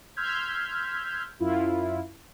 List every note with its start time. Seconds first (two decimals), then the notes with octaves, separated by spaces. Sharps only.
0.16 C6 E6 F6 G6 G#6 B6
1.40 F#2 E4 F4